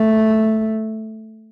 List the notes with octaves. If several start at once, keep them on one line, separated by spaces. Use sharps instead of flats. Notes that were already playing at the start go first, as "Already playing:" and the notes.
Already playing: A3